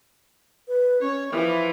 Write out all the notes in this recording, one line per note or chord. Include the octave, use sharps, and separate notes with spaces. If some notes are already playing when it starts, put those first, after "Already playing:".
B4
C#4 C#5
E3 F3 E5